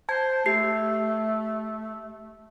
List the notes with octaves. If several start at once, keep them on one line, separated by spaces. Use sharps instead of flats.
C5 A5 G#6
A3 G4 C7